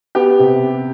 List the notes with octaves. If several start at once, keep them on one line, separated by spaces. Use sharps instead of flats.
B3 G4
C3